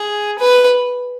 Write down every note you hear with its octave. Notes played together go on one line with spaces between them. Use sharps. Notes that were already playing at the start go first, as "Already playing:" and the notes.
Already playing: G#4
B4